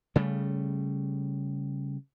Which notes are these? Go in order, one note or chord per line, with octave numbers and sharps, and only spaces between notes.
C#3 G3 A3